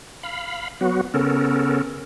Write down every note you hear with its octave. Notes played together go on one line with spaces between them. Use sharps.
F5 B5
F#3 B3 F#4
C#3 B3 C#4 A4 A#4